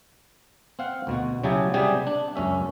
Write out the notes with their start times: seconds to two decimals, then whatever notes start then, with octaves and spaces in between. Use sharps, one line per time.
0.79 C4 F5 F#5
1.07 D2 B2 F#4
1.44 C#3 F#3 E4 G4 G#4 A5
1.74 C3 G3 G4 G#4
2.07 D4
2.35 C#2 F#2 C#4 E5